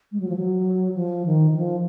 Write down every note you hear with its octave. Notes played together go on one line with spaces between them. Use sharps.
G#3
F#3
F3
F#3
F3
D#3
D#3
F3